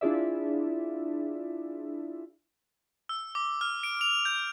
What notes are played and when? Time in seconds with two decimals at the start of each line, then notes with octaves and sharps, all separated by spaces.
0.01 D4 E4 F4 G#4 D5 E5
3.09 E6
3.35 D6
3.61 F6
3.83 D7
4.01 F7
4.25 G6